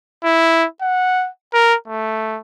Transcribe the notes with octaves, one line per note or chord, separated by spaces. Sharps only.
E4
F#5
A#4
A3